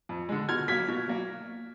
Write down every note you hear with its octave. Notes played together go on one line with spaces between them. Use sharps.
F2
D3 G#3
B2 F6 G#6
F#3 A#3 G#6 B6
B2
F#3 A#3